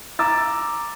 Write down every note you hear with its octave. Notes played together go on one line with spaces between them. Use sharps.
A#5 D6 E6 A6